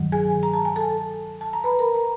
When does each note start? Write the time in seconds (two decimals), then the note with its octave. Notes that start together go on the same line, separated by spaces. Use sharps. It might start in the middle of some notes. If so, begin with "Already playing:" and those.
Already playing: G2 D#3 F#3
0.12 G#4 G#5
0.43 A#5
0.54 A5
0.65 G#5
0.76 A4 A5
1.41 A5
1.53 A#5
1.64 B4 B5
1.79 A#4 A#5
1.94 A#4 A#5